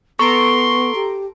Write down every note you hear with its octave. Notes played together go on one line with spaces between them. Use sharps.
B3 A4 A#5 C6 C#6 D7
G4